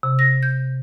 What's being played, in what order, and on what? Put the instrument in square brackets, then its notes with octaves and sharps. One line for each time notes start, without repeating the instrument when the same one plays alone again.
[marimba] C3
A#6
G6